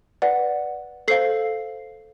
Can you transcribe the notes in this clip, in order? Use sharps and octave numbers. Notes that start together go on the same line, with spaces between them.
B4 D5 F#5
A4 C5 F5 C7